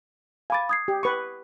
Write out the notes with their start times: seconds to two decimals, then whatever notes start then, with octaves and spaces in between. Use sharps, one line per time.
0.50 F5 G#5 B5 D6 A6
0.69 D#6 G#6 C7
0.88 G4
1.03 B4 C#6